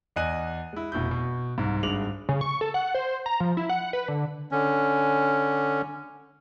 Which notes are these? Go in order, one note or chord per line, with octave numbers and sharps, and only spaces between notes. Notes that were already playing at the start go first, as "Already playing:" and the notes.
E2 D5 D#5 G#5 F#6 D#7
G#3 E4
F1 B2 E4 G6
B2
C2 G#2
G#1 G2 G#3 D6 F7 F#7
C#3
C#6
A4
F#5
C5
A#5
F3
E4
F#5
B4
D3
D3 C#4